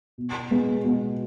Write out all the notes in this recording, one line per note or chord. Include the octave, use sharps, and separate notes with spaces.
B2
G#3 B3
B2